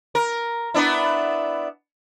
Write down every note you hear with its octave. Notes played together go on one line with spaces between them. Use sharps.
A#4
B3 D4 E4